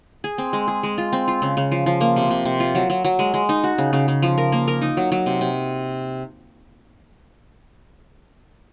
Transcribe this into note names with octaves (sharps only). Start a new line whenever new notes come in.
G#4
C4
G#3
G#4
G#3
F4
C4
F4
C#3
C#3
F3
F3
A#3
C3
C3
C3
F4
F#3
F#3
F#3
G#3
G#3
D#4
F#4
C#3
C#3
C#3
F3
A#4
A#3
A#4
D#4
F#3
F#3
C3
C3